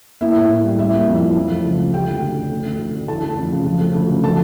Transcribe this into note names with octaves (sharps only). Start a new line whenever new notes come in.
A#3 E4 E5
A2
A2
G3
G3 E4 E5
A#3
F2
E3
F3
A3
C#2
C#3
A3 G4 G5
D2
D2
D3
A3
D2
D2
D3
E3 A4 A5
A3
F2
C#3
F3
A3
D2
C#3
F3 A4 A5